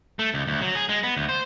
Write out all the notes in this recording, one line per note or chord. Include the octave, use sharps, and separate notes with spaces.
A3
C#2
D2
F#3
G#4
G#3
B3
D2
C5